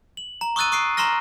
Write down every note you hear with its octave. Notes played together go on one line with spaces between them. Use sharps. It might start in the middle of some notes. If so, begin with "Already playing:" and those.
F#7
A#5
C#6 D#6 E6 F#6 A6 D#7
C#6 D#6 F#6 C7 D7
A#5 C6 C#6 F6 A#6